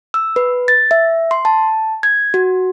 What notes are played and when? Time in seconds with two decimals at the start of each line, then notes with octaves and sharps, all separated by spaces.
0.14 E6
0.36 B4
0.68 A6
0.91 E5
1.31 C6
1.45 A5
2.03 G#6
2.34 F#4